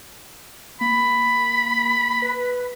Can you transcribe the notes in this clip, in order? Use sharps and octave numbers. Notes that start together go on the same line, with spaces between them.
A#3 B5
B4